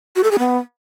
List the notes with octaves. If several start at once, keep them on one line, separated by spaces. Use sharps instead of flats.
F#4
A4
G#4
B3